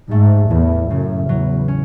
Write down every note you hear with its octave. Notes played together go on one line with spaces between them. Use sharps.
G#2 A3
E2 A2
F#2 C#3
E2 F#3
C#4